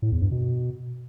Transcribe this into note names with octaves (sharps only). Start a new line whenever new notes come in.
A2
E2
G2
B2